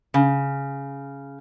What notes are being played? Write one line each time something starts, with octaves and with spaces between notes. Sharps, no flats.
C#3